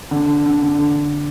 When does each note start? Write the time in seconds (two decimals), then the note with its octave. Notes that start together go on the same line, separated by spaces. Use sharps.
0.11 D3
0.46 D3
0.63 D3